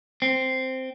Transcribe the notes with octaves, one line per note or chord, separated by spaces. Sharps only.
C4